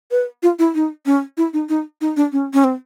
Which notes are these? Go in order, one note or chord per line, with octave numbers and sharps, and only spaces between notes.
B4
F4
E4
D#4
C#4
E4
D#4
D#4
D#4
D4
C#4
C#4
C4